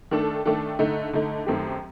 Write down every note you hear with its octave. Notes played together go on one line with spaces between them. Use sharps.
D#3 A3 D4 A4
D#3 A3 D4 A4
D3 A3 D#4
D3 A3 D#4
F#2 D#3 A3 C4 G4